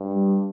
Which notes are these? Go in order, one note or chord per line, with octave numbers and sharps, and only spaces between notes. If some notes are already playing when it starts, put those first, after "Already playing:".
Already playing: G2
G3